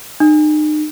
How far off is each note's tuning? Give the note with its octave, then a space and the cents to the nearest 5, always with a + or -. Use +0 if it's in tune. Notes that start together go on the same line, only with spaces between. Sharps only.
D#4 -35